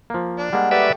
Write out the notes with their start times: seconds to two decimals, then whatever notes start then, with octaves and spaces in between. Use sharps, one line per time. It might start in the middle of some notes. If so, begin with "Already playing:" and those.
0.10 F3 A#3
0.38 D4
0.53 G3 G#3 A#3 F#5
0.71 A3 G4 B4 D5 E5